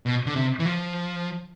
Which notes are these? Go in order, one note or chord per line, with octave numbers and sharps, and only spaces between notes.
B2
D3
C3
E3
F3